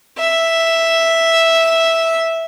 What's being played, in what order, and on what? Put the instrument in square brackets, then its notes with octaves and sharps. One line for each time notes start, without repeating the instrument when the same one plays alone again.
[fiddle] E5